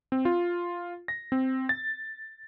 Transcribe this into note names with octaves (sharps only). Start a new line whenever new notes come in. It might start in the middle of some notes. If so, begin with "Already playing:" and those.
C4
F4
A#6
C4
A6